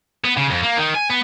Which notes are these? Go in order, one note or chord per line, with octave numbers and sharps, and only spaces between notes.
B3
C#3
F2
A#3
D#3
G#5
B3